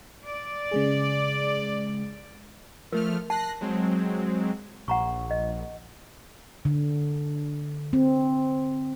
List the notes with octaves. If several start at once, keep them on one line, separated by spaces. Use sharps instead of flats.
D5
C#3 G#3 G#4
F3 A3 A#4 F6
A5 F#6 A#6 C7
F#3 G#3 C4
A#1 F#5 A#5 C#6
D#5
D3
C4